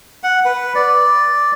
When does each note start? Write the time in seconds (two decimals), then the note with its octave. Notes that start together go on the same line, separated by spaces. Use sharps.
0.23 F#5
0.45 B4
0.75 D5